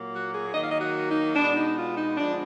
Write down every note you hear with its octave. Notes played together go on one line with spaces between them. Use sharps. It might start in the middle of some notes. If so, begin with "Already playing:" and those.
Already playing: A#2 F#3 A#3
F#4
G#4
D#3 F#3 A#3 D#5
F5
D#5
F#4
D#4
B2 G#3 B3 D4
D#4
F4
D#4
D3 F3 G#3 B3 D4